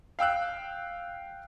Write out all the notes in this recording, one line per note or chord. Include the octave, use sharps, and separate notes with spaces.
F5 G5 E6 F#6